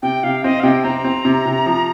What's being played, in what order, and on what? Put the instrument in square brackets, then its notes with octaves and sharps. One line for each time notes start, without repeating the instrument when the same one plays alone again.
[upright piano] C3 [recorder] G5
[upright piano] C3 [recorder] F5
[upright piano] C4 [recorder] D#5
[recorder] F5
[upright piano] C3 [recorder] G5
[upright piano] C4 [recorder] A#5
[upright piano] C4
C3
C3
F3